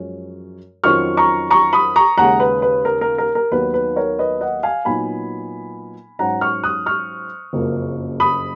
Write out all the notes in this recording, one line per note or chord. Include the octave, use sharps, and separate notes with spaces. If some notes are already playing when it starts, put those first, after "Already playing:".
Already playing: F#2 F3 G#3 C#4
F2 D#3 F#3 C#4 F4 C#6 F6
A#5 C#6
A#5 C#6
B5 D#6
A#5 C#6
D#2 C#3 G#3 F#5 A#5
B4
B4
A#4
A#4
A#4
A#4
D#2 D#3 F#3 B3 B4
B4
A#4 C#5
B4 D#5
D#5 F#5
F5 G#5
A#2 F#3 B3 D#4 G#5 B5
G#2 F#3 C#4 F#5 A#5
C#6 F6
D#6 F#6
C#6 F6
F#1 F2 C#3 F#3 A#3
B5 D#6